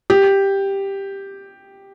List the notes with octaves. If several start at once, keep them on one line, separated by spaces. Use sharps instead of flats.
G4